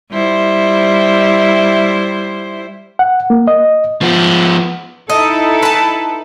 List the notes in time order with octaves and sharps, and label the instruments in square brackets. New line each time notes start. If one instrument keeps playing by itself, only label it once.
[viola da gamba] G3 E4 C5
[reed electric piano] F#5
A#3
D#5
[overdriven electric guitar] F3 B3
[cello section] D#4 E4 A4 [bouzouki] D#5
[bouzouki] B4 A5